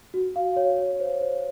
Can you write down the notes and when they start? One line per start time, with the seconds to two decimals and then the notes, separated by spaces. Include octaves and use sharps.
0.14 F#4
0.36 F5
0.56 C#5
0.78 C#5
1.00 C5
1.21 C5